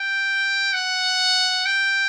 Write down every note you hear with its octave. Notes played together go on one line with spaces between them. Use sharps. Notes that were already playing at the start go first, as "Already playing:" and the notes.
Already playing: G5
F#5
G5